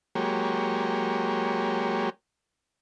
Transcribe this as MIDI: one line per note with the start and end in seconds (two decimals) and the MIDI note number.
0.15 2.10 54
0.15 2.10 56
0.15 2.10 58
0.15 2.10 67
0.15 2.10 73